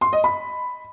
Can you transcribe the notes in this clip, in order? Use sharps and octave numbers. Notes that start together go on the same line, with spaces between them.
C6
D#5
B5